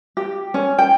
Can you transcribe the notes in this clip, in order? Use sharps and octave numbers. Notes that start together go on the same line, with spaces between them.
G4
C#4
G5